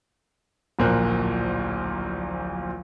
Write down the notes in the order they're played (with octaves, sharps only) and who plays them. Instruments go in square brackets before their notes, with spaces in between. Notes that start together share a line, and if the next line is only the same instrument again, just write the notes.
[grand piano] D1 A#1 A#2 A#4 C5 F#6